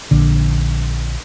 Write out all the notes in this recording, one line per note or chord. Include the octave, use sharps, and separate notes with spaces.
A#1 D3